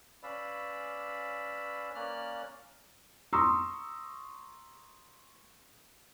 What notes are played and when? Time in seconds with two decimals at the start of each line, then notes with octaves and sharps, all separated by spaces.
0.23 C#4 B4 D5 F5 B5 E6
1.95 A#3 C#4 D5 F6 F#6
3.33 A#5 C6 C#6 D#6 E6